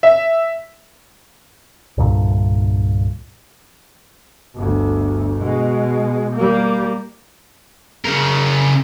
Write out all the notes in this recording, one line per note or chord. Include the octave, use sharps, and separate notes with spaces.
E5
C2 G2 A#2 D3
G1 D2
B2 G#3
G3 A#3
C#3 A#4